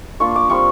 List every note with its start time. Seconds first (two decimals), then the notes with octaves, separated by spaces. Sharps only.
0.20 A#3 D4 F4 C#6
0.36 D6
0.49 G3 C4 F4 C#6